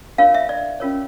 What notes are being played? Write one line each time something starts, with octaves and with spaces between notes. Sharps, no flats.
D4 F4 A#4 C#5 F5
E5
D5
C#4 F4 A#4 C#5